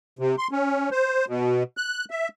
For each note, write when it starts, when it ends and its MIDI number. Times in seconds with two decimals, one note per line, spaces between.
0.19 0.36 48
0.38 0.48 84
0.51 0.90 61
0.91 1.25 72
1.28 1.63 47
1.77 2.05 90
2.10 2.28 76